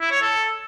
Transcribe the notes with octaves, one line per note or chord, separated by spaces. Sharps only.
E4
C#5
A4